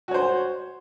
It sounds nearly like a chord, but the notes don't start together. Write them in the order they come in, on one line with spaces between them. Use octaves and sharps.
F#4 C#5 C5